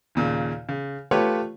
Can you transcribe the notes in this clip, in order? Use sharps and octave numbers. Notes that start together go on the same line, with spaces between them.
D#2 A#2 C#3
C#3
A3 F4 G4 B4 C#5